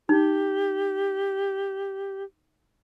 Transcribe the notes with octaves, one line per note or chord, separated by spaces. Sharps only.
D#4 G4